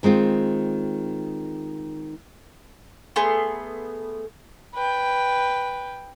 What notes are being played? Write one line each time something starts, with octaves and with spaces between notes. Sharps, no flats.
D#3 G#3 C4 F4
A3 B3 G#4 C6
B4 G5